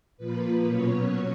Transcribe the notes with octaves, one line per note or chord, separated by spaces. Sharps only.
A#2 F3 A#3 B4
B2 F#3 C#4 C#5